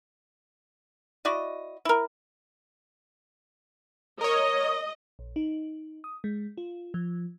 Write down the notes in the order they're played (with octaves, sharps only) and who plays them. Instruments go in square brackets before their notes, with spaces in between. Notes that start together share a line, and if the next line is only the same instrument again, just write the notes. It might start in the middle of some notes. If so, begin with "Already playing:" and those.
[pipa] E4 F#4 D5 D#5
E4 A#4
[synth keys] A#4 C#5 [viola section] D#5
[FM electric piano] A#1
D#4
D#6
G#3
F4
F3